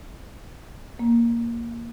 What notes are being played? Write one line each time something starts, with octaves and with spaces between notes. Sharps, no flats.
A#3